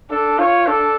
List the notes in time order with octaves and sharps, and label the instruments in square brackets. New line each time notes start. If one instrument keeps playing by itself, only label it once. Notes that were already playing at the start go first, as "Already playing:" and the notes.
[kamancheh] D4 [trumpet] A4
[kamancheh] F4 [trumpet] C#5
[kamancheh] D4 [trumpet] A4